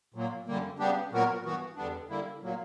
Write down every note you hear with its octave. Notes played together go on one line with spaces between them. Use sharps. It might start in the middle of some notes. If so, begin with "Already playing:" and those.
A#2 F#3 A#3
F#2 D3 G3 A#3
C#3 G3 B3 D4 G4
A#2 F#3 B3 F#4 A#4
G2 E3 B3 F#4
E2 D3 G3 B3 D4
D3 G3 A#3 E4
A#2 F#3 A#3